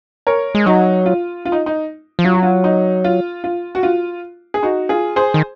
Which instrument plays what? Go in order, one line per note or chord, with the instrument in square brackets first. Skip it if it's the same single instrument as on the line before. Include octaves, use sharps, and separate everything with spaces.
[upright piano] A#4 C#5
[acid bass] G#3
[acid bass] F#3 [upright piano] D#4 F#4
[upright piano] F4
F4
D#4
D#4
[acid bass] F3
[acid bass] F#3 [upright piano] F4
[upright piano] F#4
F4
D#4
F4
F4
F#4
F4
G#4
D#4 F#4
F4 G#4
G#4 C5
[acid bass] D#3